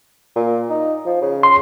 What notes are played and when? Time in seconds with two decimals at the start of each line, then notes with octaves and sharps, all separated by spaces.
0.36 A#2
0.70 D#4
1.06 F3
1.21 C#3
1.43 C6